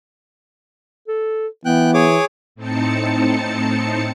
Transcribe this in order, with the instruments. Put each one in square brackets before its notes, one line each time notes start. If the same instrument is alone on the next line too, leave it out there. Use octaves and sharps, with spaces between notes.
[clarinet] A4
[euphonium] E3 [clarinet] B3 [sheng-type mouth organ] G5 F#6
[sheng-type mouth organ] G#4 C#5 D6
[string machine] A2 C4 D#4 A5 C#7